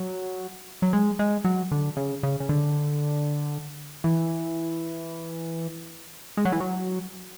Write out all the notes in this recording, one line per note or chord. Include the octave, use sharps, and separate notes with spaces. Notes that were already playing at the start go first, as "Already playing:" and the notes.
Already playing: F#3
F#3
G#3
G#3
F#3
D3
C#3
C#3
C#3
D3
E3
G#3
F#3
E3
F#3